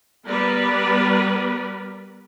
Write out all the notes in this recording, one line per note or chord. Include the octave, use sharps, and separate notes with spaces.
G3 B3 A#4 B4 D5